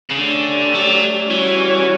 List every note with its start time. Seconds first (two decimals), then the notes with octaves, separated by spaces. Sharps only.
0.10 C#3
0.17 D3 A3 C#4 G4 D5
0.74 F#3
1.29 E3 G3 C#4 F#4 C#5